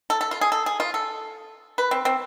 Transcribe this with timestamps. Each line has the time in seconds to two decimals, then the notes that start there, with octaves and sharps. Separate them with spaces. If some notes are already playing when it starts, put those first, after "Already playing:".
0.10 A4
0.21 A4
0.31 F4
0.41 G#4
0.52 A4
0.66 G#4
0.80 F4
0.94 A4
1.78 B4
1.91 C4
2.05 C4